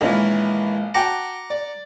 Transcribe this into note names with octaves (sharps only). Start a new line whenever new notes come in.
A#1 D#3 E3 G#3 C#4 F4
F#4 F#5 G5 A5 A#5 D6
D5